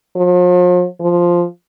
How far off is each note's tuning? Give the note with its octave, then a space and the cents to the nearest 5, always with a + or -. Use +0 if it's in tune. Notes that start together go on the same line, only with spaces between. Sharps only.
F3 +40
F3 +0